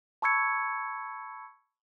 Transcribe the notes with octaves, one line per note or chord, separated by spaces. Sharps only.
A5 B5 C#6 E6 G#6 C#7